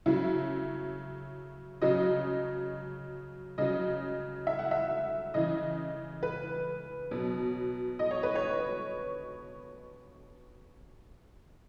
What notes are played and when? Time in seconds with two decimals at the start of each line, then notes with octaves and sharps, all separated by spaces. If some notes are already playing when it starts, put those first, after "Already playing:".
0.06 C#3 F#3 E4
1.82 C#3 F#3 D#5
3.58 C#3 F#3 D#5
4.47 E5
4.59 F#5
4.71 E5
5.34 C#3 E3 D#5
6.23 B4
7.11 B2 F#3
7.99 D#5
8.11 C#5
8.23 B4
8.35 C#5